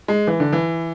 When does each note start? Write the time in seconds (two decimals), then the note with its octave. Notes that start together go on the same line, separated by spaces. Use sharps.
0.08 G#3
0.27 E3
0.40 D3
0.53 E3